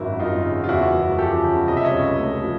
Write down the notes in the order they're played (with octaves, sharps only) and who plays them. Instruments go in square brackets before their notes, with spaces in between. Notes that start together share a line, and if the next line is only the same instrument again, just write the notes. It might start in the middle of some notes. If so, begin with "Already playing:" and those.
Already playing: [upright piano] G#1 F#2 [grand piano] E4 F#4
[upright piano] G#1 [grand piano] D#4 F4
[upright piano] C#3
[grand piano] F4
[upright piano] E2 [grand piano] E4 F#4
[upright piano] F#1
[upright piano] F3 [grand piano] G4 A4
[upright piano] C#3
[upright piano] C3 [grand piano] D#5
[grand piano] E5
C#5 D#5
[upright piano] C#2
A3
F3